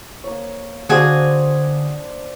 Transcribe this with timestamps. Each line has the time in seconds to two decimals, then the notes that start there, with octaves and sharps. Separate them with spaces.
0.24 A#3 C#5
0.89 D3 D4 F#4 G#4 C5 F5 G#5